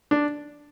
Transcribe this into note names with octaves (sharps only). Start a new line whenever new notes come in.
D4